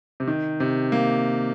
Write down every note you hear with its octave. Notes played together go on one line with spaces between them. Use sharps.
C3
D#3
C3
A#3